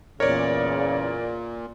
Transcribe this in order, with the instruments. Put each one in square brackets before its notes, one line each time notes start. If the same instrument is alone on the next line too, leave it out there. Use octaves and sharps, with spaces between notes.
[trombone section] E2 C#3 [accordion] A#2 [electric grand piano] A#4 D5 [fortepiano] C#5